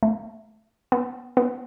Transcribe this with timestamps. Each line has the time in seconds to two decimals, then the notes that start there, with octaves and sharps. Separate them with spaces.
0.03 A3
0.92 B3
1.37 B3